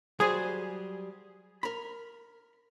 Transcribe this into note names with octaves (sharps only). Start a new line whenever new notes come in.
F#3 G3 G#4 C5
A#4 B5